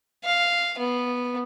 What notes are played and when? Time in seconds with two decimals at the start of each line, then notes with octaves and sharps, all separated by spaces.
0.25 F5
0.79 B3